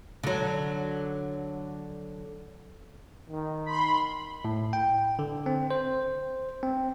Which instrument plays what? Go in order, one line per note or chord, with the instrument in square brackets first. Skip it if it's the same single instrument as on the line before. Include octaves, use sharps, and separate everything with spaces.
[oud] D3 F#3
[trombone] D#3
[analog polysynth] B5 C6
[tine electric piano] A2
G5
D3
C4
C5
C4